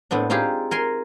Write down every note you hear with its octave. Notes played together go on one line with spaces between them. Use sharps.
A2 B3 C4 D4
C4 D#4 F4 G4 G#4
A#4 G#5 C6